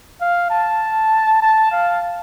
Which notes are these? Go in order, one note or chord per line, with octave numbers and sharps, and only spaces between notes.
F5
A5
A5
F5